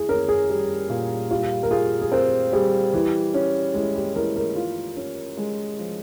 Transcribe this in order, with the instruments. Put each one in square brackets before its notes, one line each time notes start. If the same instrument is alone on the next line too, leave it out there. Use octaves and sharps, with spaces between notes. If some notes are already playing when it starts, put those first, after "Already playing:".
Already playing: [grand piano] E4 [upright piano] G#4
[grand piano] C#4 [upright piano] A#4
[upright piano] G#4
[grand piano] G3
A#2
[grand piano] G3 [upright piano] F4
[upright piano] A#4
[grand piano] F4 [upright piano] G#4
[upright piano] G#4
[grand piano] C4 [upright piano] A#4
[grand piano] G3 [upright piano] G#4
[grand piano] E3 [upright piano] G4
[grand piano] C#4
[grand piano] G#3 [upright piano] E4
[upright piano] G4
[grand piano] E3 [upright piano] A#4
[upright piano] A#4
[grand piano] F4
C#4
G#3
F3